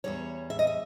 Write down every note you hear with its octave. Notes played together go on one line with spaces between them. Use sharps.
E2 B2 G3 C#5
E5
D#5
E5